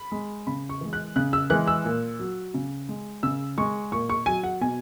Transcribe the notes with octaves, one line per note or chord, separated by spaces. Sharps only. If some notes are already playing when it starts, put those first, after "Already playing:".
Already playing: B5
G#3
C#3 B5
C#6
E3 G#3
F#6
C#3 F#6
E6
E3 G#3 F#6
E6
A#2
F#3
C#3
G#3
C#3 E6
G#3 C#6
A#2 C#6
C#6
F#3 G#5
F#5
B2 G#5